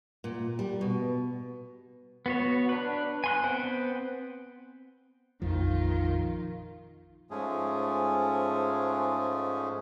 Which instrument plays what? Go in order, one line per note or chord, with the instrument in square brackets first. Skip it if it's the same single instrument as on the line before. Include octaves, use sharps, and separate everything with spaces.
[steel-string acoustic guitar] A#2
G3
B2
[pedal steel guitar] B3 F#4 C#5
D4 B4
G#5 C6 F#6
B3 C4 C5 F#5 G5
[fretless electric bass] A#1 F2 F3 [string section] D#3 F4
[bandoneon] G#2 F3 G#3 A3 C#4 G#4